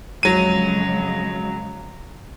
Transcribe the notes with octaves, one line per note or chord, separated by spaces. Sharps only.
F2 C#3 F#3 G#3 D#7